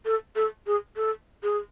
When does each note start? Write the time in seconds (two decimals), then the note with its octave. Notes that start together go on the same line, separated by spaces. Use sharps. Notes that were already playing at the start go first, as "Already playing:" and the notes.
0.05 A4
0.36 A4
0.67 G#4
0.96 A4
1.43 G#4